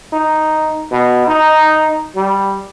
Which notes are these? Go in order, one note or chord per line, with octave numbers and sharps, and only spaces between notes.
D#4
B2
D#4
G3